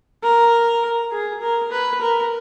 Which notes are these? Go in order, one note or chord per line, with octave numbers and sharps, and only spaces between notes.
A#4
G#4
A#4
B4
A#4